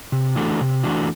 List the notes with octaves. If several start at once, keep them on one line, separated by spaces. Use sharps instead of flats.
C3
E3 A3 D4 F#4
C3
E3 A3 D4 F#4